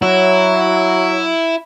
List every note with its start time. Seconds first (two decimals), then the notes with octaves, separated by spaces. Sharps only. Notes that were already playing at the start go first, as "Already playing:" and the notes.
0.02 F#3 E4